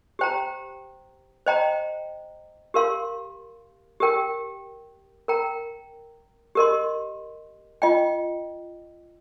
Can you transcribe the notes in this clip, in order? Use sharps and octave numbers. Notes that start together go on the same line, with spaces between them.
G4 C5 G5 A#5
C5 D#5 G5 A#5
G4 A#4 F5 C6
G4 A#4 G5
A#4 G5 A#5
G4 A#4 D#5 C6
F4 D#5 G5